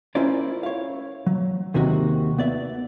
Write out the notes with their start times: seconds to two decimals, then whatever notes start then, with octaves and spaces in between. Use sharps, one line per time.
0.15 C#4 E4 F4 A#4 C5 D5
0.63 C#5 F5
1.27 F#3
1.74 D#2 C3 D#3 F#4 D#5
2.38 B3 D5 E5